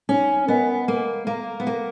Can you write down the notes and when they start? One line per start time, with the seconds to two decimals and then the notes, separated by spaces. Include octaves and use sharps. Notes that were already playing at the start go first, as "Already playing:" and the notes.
0.09 C#4 D#4
0.47 B3 A#4 D#5 G#5
0.88 A#3 A#4
1.27 A#3 F5 A#5
1.60 B3
1.67 A#3 A#4